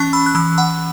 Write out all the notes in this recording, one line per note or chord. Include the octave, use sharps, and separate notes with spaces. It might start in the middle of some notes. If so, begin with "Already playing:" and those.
Already playing: E3 C#4 A5 C#6
B5 E6
F#6
E3 B5 E6
F#5 B5